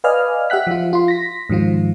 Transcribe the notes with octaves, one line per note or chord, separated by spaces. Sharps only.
B4 D5 D#5 F5 G#5 F6
G4 E5 F#5 F#6 B6
F3 F4
F4 C6
A#6 B6
G#2 D#3 F3 F4